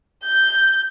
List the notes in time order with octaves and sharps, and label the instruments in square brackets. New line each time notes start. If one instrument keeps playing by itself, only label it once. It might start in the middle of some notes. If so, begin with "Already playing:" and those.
[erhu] G6